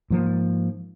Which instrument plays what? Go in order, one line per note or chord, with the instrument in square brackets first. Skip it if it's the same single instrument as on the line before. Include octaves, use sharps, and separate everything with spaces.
[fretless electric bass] G#2 F3 A#3